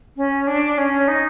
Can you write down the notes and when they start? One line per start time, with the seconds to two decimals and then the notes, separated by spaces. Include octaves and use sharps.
0.17 C#4
0.47 D4
0.77 C#4
1.08 D#4